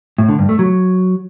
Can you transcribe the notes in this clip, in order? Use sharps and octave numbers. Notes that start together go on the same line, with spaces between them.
A2
D3
G2
A3
F#3